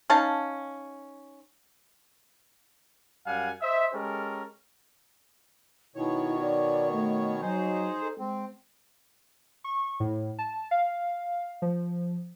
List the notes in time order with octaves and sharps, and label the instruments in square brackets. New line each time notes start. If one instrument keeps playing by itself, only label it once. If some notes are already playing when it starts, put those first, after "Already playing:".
[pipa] C#4 D#4 F5 A5
[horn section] F#2 G3 F5 F#5 G#5
C5 D#5 E5
G#3 C#4 G4 A4 A#4
[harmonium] B2 D#3 C#5 [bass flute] E4
[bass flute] D5
A3
[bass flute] F#3 [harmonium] D#4 G#4 C5
[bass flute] A4
[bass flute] G#3 [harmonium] C4
[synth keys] C#6
A2
A5
F5
F3